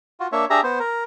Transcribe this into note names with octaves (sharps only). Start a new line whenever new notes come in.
F4 F#4
A#3 D4 C#5 E5
D4 G4 G#4 E5 A#5
B3 C5
A#4